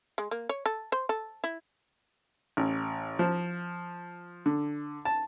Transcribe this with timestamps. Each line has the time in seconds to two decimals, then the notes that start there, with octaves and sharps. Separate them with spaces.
0.18 G#3
0.31 A#3
0.49 C#5
0.66 A4
0.92 C5
1.09 A4
1.44 E4
2.57 A1
3.19 F3
4.46 D3
5.05 A5